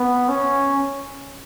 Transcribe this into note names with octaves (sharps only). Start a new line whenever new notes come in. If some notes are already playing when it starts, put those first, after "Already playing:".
Already playing: B3
C#4